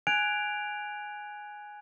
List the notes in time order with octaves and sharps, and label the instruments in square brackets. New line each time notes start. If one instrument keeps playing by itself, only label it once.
[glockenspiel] G#5 F#6 G#6 D7 F7